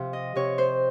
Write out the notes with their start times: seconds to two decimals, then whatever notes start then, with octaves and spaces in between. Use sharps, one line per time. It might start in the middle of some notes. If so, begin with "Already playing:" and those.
Already playing: C3 F3 F5
0.13 D#5
0.36 C3 C#5
0.58 C5